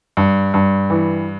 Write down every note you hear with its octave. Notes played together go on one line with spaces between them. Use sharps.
G2
G2
E3